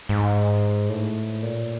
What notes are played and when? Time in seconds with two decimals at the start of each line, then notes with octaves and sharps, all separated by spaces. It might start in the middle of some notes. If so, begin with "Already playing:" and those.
0.09 G#2
0.89 A2
1.43 A#2